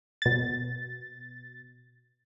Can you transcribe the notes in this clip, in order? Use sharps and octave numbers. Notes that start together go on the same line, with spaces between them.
B2 A6